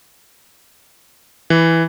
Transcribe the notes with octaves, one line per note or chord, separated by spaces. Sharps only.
E3